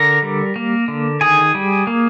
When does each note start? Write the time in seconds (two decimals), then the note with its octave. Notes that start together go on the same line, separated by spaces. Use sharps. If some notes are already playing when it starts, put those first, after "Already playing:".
Already playing: D3 A#4 A#5
0.23 G3
0.56 A#3
0.88 D3
1.21 D#3 G#4 G#5
1.55 G3
1.87 A#3